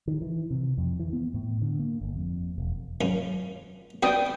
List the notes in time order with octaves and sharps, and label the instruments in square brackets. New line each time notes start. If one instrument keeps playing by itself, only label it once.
[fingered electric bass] D#3
E3
C3
F2
E3
B3
A2
D3
A#3
G1
F2
E1
[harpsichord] F#2 F3
[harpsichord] B3 D4 F#4 [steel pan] G5 D#6